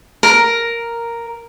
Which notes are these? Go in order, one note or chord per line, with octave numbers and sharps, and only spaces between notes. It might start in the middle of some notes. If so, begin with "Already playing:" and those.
A#4